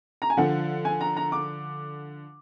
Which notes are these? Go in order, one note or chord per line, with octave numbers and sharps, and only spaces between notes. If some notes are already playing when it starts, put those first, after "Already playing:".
A#5
G#5
D3 F3 F#5
G#5
A#5
A#5
D6